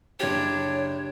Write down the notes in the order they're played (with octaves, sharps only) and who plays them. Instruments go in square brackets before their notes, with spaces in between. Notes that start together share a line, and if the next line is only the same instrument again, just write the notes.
[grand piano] F#1 G4 [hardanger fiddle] D4 [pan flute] C#5